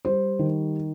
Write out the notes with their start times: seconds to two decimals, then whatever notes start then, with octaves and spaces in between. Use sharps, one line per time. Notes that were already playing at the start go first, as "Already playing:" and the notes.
0.05 G3 C5
0.39 D#3